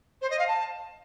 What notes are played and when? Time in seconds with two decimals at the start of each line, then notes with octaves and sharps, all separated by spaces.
0.21 C5
0.30 D#5
0.39 F5
0.47 A5